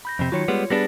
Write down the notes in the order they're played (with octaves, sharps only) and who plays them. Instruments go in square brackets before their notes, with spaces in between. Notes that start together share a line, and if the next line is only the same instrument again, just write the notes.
[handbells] B5 G6 A#6
[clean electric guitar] F2 C3
[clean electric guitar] D#3 F#3 [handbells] F4 C#5 C#7
[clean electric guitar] G3 G#3 B3
[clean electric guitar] G3 B3 D4 [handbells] G#4 A6 A#6